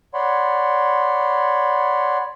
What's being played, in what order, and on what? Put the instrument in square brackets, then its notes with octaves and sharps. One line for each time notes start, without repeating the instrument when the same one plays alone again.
[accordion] C#5 D5 F#5 B5 C6